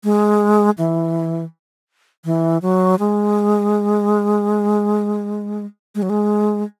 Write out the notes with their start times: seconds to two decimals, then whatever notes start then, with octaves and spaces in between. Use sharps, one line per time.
0.04 G#3
0.78 E3
2.25 E3
2.62 F#3
2.99 G#3
5.95 G#3
6.02 F#3
6.10 G#3